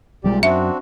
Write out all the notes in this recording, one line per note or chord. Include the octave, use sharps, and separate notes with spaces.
B1 A#2 G3 G#3 G4 D5
F#2 C4 D4 F#4 E5